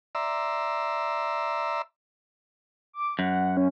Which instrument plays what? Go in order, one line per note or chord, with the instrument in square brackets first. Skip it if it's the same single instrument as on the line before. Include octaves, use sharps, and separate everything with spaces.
[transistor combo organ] D5 E5 A#5 C6 E6
[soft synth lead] D6
[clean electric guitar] F#2 [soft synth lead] F#5
[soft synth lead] C#4